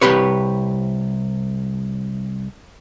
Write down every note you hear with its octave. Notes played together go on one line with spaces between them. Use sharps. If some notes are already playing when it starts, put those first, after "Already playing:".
C2 G2 G4 B4 C#5